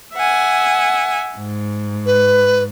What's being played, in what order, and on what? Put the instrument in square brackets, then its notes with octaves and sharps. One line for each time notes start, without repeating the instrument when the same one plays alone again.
[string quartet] E5 F#5 G#5
G#2
[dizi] B4